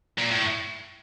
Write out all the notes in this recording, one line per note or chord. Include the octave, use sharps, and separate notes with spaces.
A#2
A2